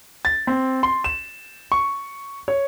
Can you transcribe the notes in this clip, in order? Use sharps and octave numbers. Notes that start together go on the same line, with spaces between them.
A6
C4
C6
E7
C#6
C#5